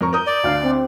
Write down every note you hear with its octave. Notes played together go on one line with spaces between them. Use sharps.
F2 A#4 C#6
A#4 D#6 G6
D5
D2 D4 F5
C4